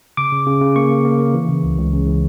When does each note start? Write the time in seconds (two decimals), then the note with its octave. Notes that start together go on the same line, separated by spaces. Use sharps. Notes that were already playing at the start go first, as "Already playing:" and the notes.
0.17 C#3 D6
0.32 C#3
0.47 C#3
0.61 C#3
0.76 A#3 C#6
0.91 A#3
1.05 A#3
1.19 A#3
1.34 E3
1.49 C#3
1.63 C#2
1.78 C#2
1.93 C#3
2.07 E3